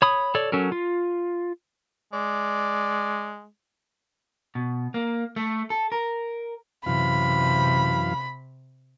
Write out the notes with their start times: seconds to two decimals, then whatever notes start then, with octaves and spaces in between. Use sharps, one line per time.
0.02 C#5 B5 D#6
0.35 A4 C#5 D5
0.52 F#3 C#4 A4 A#4
0.72 F4
2.13 G#3 D5
4.55 B2
4.94 A#3
5.36 A3
5.70 A4
5.92 A#4
6.86 F#2 C3 E3 F5 B5